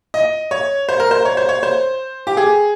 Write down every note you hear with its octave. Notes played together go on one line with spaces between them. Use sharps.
D#5
C#5
C5
A#4
C5
C#5
C5
C#5
C5
G4
G#4